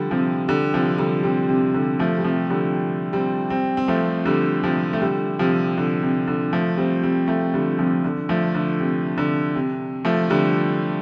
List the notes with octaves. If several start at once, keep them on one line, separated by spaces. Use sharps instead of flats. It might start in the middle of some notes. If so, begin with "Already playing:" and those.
Already playing: D3 F3 G3
C3 F3
D3 G3
C3 F3
D3 G3
G3 C4
C3
D3
F3 A3
G3
C3 F3
D3 G3
G3 C4
G3 C4
C4
F3 A3
D3 G3
C3 F3
A3
D3 G3
C3 F3
D3
C3
D3
F3 A3
G3 C4
G3 C4
F3 A3
D3 G3
C3 F3
D3
F3 A3
D3
C3
D3
C3
F3 A3
D3 G3